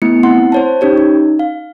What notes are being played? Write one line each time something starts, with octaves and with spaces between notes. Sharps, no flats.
A3 B3 E4 C#7
C4 E4 F#5 C6
C5 C#5 A5
C#4 D#4 G4 C#5
D#4
F5